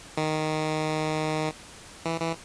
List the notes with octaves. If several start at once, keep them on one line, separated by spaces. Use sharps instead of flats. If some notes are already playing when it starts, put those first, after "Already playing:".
D#3
E3
E3